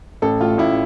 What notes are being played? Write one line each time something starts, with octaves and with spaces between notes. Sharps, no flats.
A1 A4
A2 F4
A1 E4